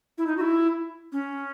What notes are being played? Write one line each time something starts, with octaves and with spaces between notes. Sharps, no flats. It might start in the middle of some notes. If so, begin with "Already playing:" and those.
E4
D#4
F#4
E4
C#4